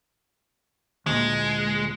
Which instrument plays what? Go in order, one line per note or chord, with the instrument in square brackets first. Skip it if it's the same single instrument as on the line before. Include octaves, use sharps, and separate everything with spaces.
[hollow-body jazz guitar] D2 A#2 [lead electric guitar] G#3